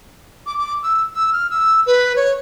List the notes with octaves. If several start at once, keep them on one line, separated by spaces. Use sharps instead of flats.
D6
D6
E6
E6
F6
E6
B4
C#5